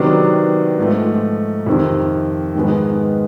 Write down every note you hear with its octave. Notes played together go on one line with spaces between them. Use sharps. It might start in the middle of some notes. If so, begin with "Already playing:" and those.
Already playing: C3 D#3 F#3 B3 D4
G#2 F3 A3
F2 C3 D#3
G#2 D#3 G#3 B3